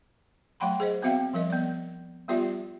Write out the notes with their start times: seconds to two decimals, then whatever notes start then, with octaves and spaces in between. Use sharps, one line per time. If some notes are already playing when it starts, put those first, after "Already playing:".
0.60 F#3 A3 F#5 G5 B5 C6
0.80 G#4 C5 D#5
1.02 B3 C4 F#4 E5 F5 G5
1.34 F3 G3 A#4 D#5
1.50 B3 D5
2.28 G3 B3 F4 G4 D5 E5